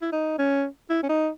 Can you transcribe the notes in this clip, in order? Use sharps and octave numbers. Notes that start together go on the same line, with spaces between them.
E4
D#4
C#4
E4
C#4
D#4